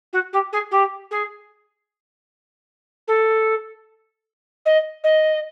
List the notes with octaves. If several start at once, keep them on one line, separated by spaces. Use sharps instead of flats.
F#4
G4
G#4
G4
G#4
A4
D#5
D#5